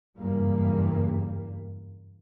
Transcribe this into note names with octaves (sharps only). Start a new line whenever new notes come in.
F#1 E2 G2 G3 A#3